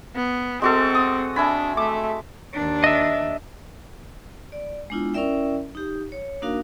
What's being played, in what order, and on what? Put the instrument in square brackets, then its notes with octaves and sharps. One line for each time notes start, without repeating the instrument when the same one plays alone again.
[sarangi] B3
[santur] G#3 F#4 A4 [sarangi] C4
[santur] D#6
[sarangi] D4 [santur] E5 G#5 B5
[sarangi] A3 [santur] D6
[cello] D#2 D4
[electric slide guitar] D#5 E5
[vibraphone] D5
G#3 B3 D4 E4 F4
C#4 E4 A#4 D5 E5 G5
D#4 G4
C#5
A#3 D4 D#4 F#4 A#4 F5